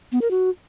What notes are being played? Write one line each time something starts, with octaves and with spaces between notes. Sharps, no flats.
B3
A#4
F#4